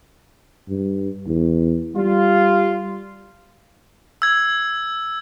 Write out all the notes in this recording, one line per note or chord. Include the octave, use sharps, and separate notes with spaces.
G2
E2
G3 F4
E6 G#6